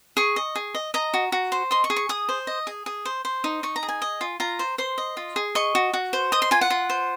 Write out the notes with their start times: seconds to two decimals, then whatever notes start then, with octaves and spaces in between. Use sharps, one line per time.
0.17 G#4 C#6
0.36 D#5
0.55 G#4
0.75 D#5
0.94 D#5 A#5
1.14 F#4
1.32 F#4
1.52 C5
1.71 D#5 C6
1.84 C#6
1.90 G#4
1.96 C#6
2.09 G#4 D#6
2.29 C5
2.47 D#5
2.67 G#4
2.86 G#4
3.05 C5
3.25 C5
3.44 D#4
3.63 D#4 C#6
3.76 A#5
3.83 G#4
3.89 G#5
4.02 D#5
4.21 F4
4.40 F4 A#5
4.59 C5
4.78 C5 C6
4.98 D#5
5.17 F4
5.36 G#4
5.55 D#5 C#6
5.75 F#4
5.93 F#4
6.13 C5
6.32 D#5 D#6
6.42 C6
6.51 F4 G#5
6.61 F#5
6.70 F4
6.90 C5